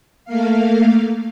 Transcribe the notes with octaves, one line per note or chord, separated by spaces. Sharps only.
A3 A#3 F5